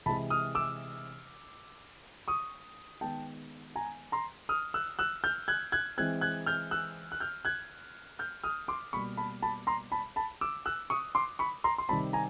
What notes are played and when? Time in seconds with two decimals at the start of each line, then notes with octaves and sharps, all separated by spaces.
0.06 C3 E3 G#3 A5 B5
0.30 D#6 F6
0.55 D6 E6
2.28 C#6 D#6
3.01 D#3 G#3 B3 G5 A5
3.76 G#5 A#5
4.12 A#5 C6
4.49 D#6 F6
4.74 E6 F#6
4.99 E6 F#6
5.24 F6 G6
5.48 F#6 G#6
5.72 F#6 G#6
5.98 E3 G#3 C4 F#6 G#6
6.21 F#6 G#6
6.46 F6 G6
6.71 E6 F#6
7.12 F#6
7.20 F6 G6
7.45 F#6 G#6
8.19 F6 G6
8.44 D#6 F6
8.68 C6 D6
8.93 B2 G3 A#3 B5 C#6
9.17 A5 B5
9.42 A5 B5
9.67 A#5 C6
9.92 A5 B5
10.16 A5 B5
10.41 D6 E6
10.66 E6 F#6
10.90 C#6 D#6
11.15 C6 D6
11.39 B5 C#6
11.64 A#5 C6
11.78 C6
11.89 C3 D#3 G3 C4 A5 B5
12.13 G#5 A#5